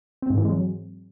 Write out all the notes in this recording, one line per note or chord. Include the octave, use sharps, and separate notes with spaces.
C4
G#2
E3
G#3
F#3